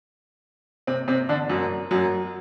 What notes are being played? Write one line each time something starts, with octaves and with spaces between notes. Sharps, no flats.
C3 C4
C3 C4
D3 D4
F#2 F#3
F#2 F#3